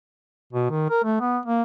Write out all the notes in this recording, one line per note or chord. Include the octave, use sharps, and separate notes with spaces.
B2
D#3
A#4
A3
B3
A#3